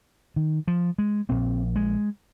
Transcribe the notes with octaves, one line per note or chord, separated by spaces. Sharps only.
D#3
F3
G#3
A#1 A#2 C4
G#3